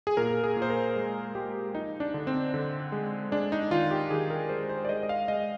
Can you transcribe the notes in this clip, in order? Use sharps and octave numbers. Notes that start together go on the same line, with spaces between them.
G#4
A#2 A#4
G#4
A#2
C5
A#4
G#3
G#3 G4
F3 D#4
D4
D3
C4
D3
G#3
G#3 D4
D#4
D#3 F4
G4
D#3 G#4
A#4
G#3 C5
C5
D5
G#3 D#5
D#5
F5
G#3 D#5